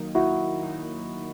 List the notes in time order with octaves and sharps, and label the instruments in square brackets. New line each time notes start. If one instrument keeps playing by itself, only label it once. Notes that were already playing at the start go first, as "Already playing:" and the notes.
Already playing: [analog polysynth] D#3 F#3 A#3 D#4
[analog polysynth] D#3 F#3 A#3 D#4 [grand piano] E4 F#4
[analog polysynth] D#3 F#3 A#3 D#4